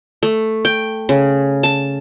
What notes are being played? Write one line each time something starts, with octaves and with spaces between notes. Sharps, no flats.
A3
G5
C#3
A5